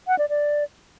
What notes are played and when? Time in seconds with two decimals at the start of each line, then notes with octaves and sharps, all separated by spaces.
0.08 F#5
0.18 D5
0.29 D5